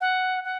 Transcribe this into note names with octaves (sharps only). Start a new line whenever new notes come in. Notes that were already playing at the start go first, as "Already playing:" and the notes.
F#5
F#5